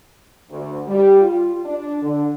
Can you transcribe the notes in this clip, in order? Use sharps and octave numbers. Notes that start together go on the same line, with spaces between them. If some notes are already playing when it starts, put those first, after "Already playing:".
D2
G3
F4
D4
D3